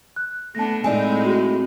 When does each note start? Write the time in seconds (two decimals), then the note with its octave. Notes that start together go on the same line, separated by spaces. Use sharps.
0.16 F#6
0.55 A3 B3 D4 A5 A#6
0.84 A2 G#3 C4 D#4 E4 D5 G#5
1.25 F#4 G#4